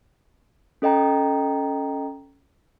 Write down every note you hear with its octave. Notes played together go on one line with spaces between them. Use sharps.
C#4 A4 D#5 G5 A#5